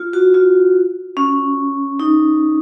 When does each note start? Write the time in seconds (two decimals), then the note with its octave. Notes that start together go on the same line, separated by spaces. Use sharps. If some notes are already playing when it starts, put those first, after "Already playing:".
Already playing: F4
0.13 F#4
0.34 F4
1.17 C#4
2.00 D#4